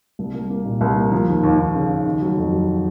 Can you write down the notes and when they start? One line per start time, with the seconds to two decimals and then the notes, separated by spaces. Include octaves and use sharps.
0.19 C2
0.34 C2
0.50 A#3
0.65 A#2
0.81 C2
0.96 A#3
1.12 F3
1.28 D#2
1.43 D#2
1.58 D#2
1.75 C#3
1.89 D#2
2.06 D#3
2.22 F#3
2.37 F2
2.53 F#3